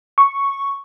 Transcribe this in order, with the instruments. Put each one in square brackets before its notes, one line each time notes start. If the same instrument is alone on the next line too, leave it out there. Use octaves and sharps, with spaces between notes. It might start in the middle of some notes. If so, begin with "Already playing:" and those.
[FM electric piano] C#6